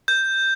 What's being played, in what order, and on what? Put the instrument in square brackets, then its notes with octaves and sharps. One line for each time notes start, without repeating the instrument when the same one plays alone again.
[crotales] G6